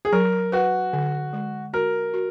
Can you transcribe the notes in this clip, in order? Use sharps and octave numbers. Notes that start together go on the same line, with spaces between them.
G#4
F#3 A#4
F#4 B4
D3
G#3
F#4 A#4
F#4